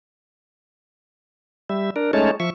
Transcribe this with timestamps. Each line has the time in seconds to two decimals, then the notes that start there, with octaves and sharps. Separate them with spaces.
1.69 G3 E5
1.96 D4 A#4
2.13 G#3 A3 C#4 D#4 C#5 A5
2.40 F3 E5 C#6